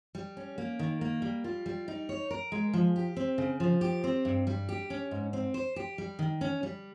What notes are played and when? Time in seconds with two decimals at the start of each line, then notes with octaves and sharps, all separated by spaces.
0.15 G3
0.37 C#4
0.58 A#3
0.79 D#3
1.01 A#3
1.22 G3
1.44 F4
1.66 G3
1.88 D#4
2.09 C#5
2.31 A#4
2.52 G#3
2.73 F3
2.96 G4
3.17 C4
3.38 C#3
3.60 F3
3.81 G4
4.04 C4
4.25 G2
4.47 G3
4.69 G4
4.90 C#4
5.11 G#2
5.33 C4
5.54 C5
5.76 G4
5.98 G3
6.19 D#3
6.41 C#4
6.63 G3